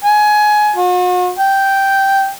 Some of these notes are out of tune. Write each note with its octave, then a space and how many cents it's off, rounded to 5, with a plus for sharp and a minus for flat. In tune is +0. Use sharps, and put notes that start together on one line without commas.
G#5 +20
F#4 -45
G5 -5